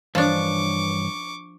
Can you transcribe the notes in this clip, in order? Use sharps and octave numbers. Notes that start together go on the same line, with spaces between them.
G2 E3 F3 D4 C#5 C#6 D6